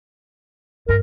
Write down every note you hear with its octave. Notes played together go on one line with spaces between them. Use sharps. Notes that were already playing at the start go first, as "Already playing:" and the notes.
G2 A#4